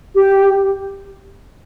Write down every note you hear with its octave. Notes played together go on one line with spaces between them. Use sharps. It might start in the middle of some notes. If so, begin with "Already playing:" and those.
G4